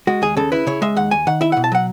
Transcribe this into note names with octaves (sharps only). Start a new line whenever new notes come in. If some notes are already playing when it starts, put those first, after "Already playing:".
G#3 F#4
D#2 G#4
C#3 A4
E4 B4
C#3 C#5
G#3 E5
D#2 F#5
D#2 G#5
D#3 F#5
E4 E5
B2 F#5
A5
F#3 F#5